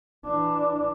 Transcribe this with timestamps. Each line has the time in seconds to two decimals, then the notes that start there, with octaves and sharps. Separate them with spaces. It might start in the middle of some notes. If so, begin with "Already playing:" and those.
0.25 E3 D4